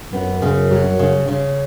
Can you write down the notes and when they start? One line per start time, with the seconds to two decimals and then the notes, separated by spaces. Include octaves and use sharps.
0.12 F#2 B3
0.42 C#3
0.71 F#3
0.99 C#3
1.28 C#3